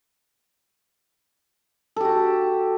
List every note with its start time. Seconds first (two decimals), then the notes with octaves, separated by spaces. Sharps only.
1.96 A4
2.01 G4
2.05 F#4